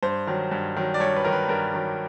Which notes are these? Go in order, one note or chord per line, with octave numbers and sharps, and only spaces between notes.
G2 C5
D#3 F#3
G2
D#3 F#3
D5
G2 C#5
B4
D#3 F#3 A#4
B4
G2 A#4
D#3 F#3